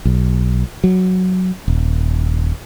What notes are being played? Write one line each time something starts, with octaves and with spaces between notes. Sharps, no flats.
B1
F#3
D#1